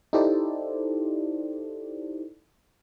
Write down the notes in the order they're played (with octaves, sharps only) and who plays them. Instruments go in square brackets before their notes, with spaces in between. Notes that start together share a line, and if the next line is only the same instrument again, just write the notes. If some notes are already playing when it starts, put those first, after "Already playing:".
[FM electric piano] D#4 E4 G4 A4 C5 D5